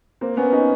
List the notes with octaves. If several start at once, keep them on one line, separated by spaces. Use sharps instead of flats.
A#3 C4
B3 C#4
C#4 D#4